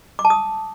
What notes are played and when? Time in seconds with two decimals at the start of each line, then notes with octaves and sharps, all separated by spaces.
0.19 D6
0.25 A5
0.30 D#6